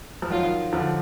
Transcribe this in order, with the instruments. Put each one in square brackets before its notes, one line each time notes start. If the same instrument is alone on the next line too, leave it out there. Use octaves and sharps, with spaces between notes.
[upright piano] F3
[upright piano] D#3 F#3 [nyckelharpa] F4
[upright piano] D3 F3